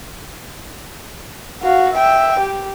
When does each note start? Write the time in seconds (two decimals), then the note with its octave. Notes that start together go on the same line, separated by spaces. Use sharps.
1.63 F#4 F5
1.93 E5 G5
2.40 G4